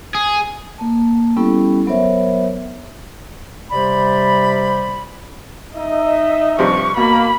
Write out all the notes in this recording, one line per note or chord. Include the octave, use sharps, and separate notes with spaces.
G#4
A#3 A5
G3 B3 C#4 E4 G4 A4
F#3 B3 A#4 C5 C#5 E5
C3 G3 C5 D5 B5
D#4 D#5 E5
G2 C3 F3 C#6
B2 A#3 B5